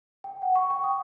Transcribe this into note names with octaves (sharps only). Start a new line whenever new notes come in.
G5
F#5
C#6
G5
D#6